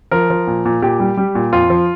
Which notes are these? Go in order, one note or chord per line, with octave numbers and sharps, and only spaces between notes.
F3 A#4
F3
A#2
A#2
A#2 G4
G3
G3
A#2
F2 F4
F3